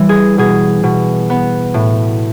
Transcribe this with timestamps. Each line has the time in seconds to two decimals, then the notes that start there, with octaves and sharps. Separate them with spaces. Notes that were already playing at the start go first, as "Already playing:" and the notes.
Already playing: E3 G3
0.09 G#4
0.38 B2 G#4
0.83 B2
1.30 B3
1.74 A2